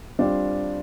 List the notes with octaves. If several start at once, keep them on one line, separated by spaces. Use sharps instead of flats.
G3 C4 D4 F4